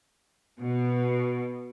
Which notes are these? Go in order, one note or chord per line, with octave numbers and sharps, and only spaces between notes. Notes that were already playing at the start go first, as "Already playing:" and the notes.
B2